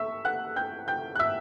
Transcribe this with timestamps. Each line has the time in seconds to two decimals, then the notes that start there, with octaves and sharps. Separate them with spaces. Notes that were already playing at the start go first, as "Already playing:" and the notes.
Already playing: E5 C#6 E6
0.25 F#5 F#6
0.56 G5 G6
0.88 G5 G6
1.16 F#6
1.19 E5 E6